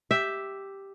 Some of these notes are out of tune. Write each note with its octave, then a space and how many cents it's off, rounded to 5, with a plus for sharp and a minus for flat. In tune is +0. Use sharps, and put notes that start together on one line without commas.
G4 +0 E5 +0